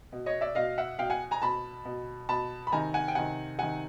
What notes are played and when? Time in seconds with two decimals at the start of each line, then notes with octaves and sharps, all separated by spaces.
0.12 B2
0.26 C#5 D#5
0.41 D5 E5
0.55 B2 D#5 F5
0.78 E5 F#5
0.99 B2 F5 G5
1.10 F#5 G#5
1.31 G#5 A#5
1.42 B2 A5 B5
1.85 B2
2.29 B2 A5 B5
2.67 B5
2.72 C3 D#3 G#5 A#5
2.94 F#5 G#5
3.08 G5
3.15 C3 D#3 F#5 G#5
3.59 C3 D#3 F#5 G#5